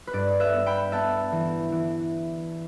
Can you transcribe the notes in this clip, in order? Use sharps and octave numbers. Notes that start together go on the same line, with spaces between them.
B4
G2 D5
B4 E5
B3
G5 B5
B3 E5 A5
E3
E3